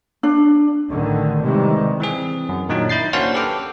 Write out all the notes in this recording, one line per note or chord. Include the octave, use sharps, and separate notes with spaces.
D4
A1 D3 D#3
C3 D#3 E3 G3 G#3
E3 C4 G#4
F#2
A#2 D#3 F#3 D4 D#4
E4 G6 A6 C7
A#3 C#4 D4 F#4 C5 F5
G4 A4 B4 G5 D6 F6